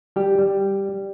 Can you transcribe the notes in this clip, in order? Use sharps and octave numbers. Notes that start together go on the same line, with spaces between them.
G3 G4
G3